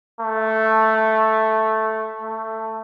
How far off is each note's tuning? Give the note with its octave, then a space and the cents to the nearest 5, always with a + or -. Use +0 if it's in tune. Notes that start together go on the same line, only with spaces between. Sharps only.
A3 +0
A3 +15